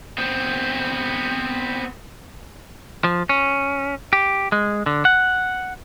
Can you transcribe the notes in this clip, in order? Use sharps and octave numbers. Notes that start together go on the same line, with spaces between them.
B3 C4
F3
C#4
G4
G#3
D3
F#5